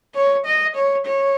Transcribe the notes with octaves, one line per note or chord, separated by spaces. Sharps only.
C#5
D#5
C#5
C#5